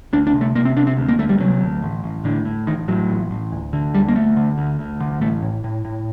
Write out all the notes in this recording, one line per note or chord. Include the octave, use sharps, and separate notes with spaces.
D2 D4
D4
C3
A3
C3 A#3
C4
C3 D4
C4
D2
A#3
D2 A3
G3
C3 F#3
D2
A1
A1
A2 D3
A2
A1 D#3
A2 F#3
A1
A1
D2
D3
D2 G3
A#3
D2 A3
D3
D2
D2
D3
A1 A3
A2
A2
A2